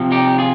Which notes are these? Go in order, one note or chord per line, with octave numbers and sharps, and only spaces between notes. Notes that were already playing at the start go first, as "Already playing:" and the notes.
Already playing: C3 F3
D#4 G4
F4 G#4